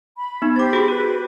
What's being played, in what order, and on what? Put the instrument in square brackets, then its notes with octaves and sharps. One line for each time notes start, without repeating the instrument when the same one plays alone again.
[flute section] B5
[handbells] B3 D#4
[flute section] G4 C5 B5 [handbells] D6 A6
[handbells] F#4 G#4
[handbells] F#4 [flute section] B4